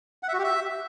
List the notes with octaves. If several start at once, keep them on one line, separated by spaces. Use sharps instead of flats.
F#5
E5
F#4
G4
E5